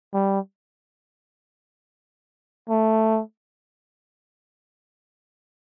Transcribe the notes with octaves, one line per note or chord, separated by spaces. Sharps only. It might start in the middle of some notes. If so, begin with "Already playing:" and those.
G3
A3